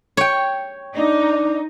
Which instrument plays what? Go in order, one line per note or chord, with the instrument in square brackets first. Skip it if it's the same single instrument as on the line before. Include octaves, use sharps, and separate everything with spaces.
[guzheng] C#5 G5
[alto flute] D4 [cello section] D#4